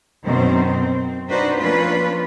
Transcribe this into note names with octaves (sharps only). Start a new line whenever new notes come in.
F#2 B2 D#3 C4 C5
C4
D4 D#4 F#4 B4 C5
F3 A#3 C#4 D4 F4 B4